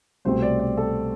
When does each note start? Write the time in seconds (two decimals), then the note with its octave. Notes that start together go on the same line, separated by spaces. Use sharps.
0.25 C2 B2 A3 C4 C5
0.42 D5
0.60 D5
0.77 A4